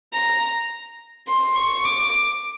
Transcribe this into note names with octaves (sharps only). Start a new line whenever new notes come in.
A#5
C6
C#6
D6